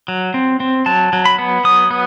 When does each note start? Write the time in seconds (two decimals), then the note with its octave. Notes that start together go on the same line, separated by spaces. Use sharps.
0.08 F#3
0.34 C4
0.60 C4
0.86 F#3 A5
1.13 F#3
1.26 B5
1.39 B3
1.64 F#3 D#6
1.91 B3